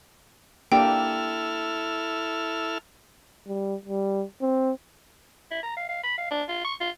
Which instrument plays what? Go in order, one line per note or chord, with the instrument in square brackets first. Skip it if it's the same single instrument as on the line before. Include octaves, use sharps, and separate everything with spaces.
[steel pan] A#3 D4 G4 [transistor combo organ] E4 A4 F6 [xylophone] G5
[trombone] G3
G3
C4
[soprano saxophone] E4
A#5
F5
F5
B5
F5
D4
F4
C#6
F4